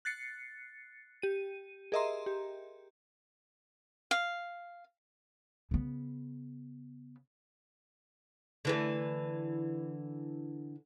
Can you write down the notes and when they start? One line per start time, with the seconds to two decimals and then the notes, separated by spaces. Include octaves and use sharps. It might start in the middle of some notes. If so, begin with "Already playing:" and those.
0.05 F#6 A6 C7 C#7
1.22 G4 D#7
1.92 G#4 A#4 D#5 E5 A#5 C6
2.26 G4
4.11 F5
5.71 C#3 B3
8.65 D3 E3 A3